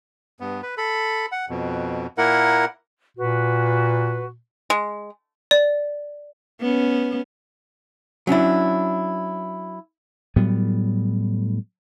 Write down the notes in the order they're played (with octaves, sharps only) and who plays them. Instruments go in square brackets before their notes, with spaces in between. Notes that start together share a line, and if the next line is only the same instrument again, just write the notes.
[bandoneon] G2 B3
B4
A4 B5
F#5
F2 B2
A#2 A#3 E4 A#4 F#5
[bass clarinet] A#2 [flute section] F#4 B4
[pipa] G#3
[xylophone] D5
[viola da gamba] B3 C#4
[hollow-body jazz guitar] F#3 C#4 D4 E4
[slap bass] A2 F#3 G3 B3